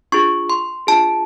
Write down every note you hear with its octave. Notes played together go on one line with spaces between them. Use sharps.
D4 F4 G#4 C#6
C6
D4 F4 G#4 A5